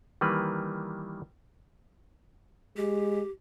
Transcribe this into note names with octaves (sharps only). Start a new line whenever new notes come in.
D#3 E3 G3 A#3 B4
G#3 G4